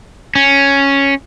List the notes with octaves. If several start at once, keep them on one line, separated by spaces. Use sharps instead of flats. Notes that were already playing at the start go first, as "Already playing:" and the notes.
C#4